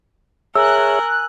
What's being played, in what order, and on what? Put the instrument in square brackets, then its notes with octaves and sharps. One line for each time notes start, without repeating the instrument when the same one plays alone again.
[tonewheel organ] G#4 C#5 E5 [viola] A#4 [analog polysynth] G#5 F#6 [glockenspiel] E6